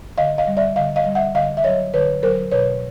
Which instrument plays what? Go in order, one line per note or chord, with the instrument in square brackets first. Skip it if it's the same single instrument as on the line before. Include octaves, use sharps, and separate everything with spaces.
[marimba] D3 D#5 F5
D#5 F5
G3
D5 E5
D3 D#5 F5
D#5 F5
G3
E5 F#5
D3 D#5 F5
E5
F#3 C#5 D#5
D3 B4 C#5
F#3 A#4 C5
B2 B4 C#5